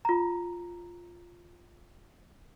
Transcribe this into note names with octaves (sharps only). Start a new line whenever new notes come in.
F4 A#5